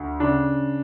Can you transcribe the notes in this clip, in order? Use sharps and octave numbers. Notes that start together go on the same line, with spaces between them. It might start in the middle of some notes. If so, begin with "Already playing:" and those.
Already playing: D2
C#3 D4